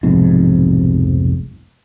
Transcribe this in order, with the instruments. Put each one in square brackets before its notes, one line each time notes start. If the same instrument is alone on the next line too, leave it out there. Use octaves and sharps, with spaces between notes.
[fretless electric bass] F1 B1 F2 G#2